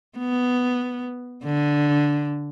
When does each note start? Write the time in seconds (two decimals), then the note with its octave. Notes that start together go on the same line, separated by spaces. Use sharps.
0.18 B3
1.44 D3